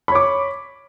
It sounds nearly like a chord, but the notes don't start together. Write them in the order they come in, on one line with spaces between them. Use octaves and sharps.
B5 C#5 D6